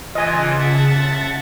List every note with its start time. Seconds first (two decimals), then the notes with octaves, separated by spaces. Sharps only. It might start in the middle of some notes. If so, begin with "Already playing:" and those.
0.15 C#3 E3 F4 D#5 G#5 A5 A6
0.60 E5 F#5